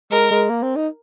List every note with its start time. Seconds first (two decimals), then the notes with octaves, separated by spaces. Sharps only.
0.11 G#3 A#4
0.31 G#3
0.50 A#3
0.63 C4
0.76 D#4